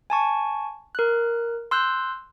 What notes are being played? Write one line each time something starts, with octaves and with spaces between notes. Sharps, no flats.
G#5 A5 C#6
A#4 F#6
C6 E6 F#6 G6